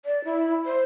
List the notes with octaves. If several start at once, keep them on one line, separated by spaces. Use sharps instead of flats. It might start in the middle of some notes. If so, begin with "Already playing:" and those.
D5
E4
C5